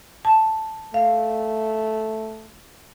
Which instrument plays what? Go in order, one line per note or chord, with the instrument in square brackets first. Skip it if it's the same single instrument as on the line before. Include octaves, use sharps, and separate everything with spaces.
[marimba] A5
[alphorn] A3 [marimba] F5